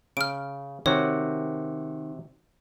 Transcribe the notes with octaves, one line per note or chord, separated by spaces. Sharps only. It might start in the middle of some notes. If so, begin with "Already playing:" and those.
C#3 F6 D7
C3 D#3 F#4 C#5